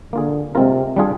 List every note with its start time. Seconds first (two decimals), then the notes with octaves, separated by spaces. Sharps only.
0.13 D3 A#3 F4 G#4
0.54 C3 G#3 C4 F4 A#4
0.96 G3 D4 F4 G#4